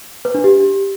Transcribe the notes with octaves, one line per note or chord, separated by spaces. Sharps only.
B4
D4
G4